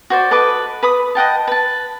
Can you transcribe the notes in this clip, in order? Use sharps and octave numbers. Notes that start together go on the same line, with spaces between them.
F#4 C5 D5
A4 B4 D#5 D6
B4 B5 D#6
D#5 F#5 G5 A5
B4 A5